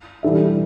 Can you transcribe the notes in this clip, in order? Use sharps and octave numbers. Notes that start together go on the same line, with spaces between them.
E3 G3 D4 A4 E5